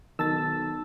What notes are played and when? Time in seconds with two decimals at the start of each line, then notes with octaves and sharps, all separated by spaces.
0.19 B1 D#3 A5 E6 A6